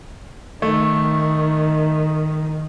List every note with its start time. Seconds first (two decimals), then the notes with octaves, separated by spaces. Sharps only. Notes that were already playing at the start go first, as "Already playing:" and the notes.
0.62 D#3 A3